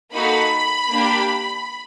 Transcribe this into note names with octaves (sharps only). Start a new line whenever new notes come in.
A#3 D#4 F#4 A4 B5
A#3 D4 G4